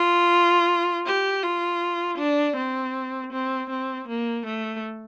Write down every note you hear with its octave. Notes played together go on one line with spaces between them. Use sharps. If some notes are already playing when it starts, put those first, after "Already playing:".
Already playing: F4
G4
F4
D4
C4
C4
C4
A#3
A3